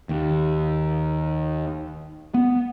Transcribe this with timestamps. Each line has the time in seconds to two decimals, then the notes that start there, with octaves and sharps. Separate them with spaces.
0.09 D#2
2.34 B3